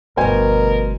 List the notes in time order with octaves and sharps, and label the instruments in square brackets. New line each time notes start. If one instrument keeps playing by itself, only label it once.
[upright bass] G1 A3 [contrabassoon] B2 [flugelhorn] A#4 [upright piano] C5 G#5